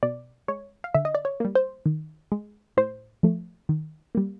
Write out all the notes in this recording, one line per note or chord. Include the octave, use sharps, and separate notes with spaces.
B2 D5
G#3 C#5
F5
D3 E5
D#5
D5
C#5
G3 A#3
C5
D#3
G#3
A2 C5
F3 A3
D#3
G3 A#3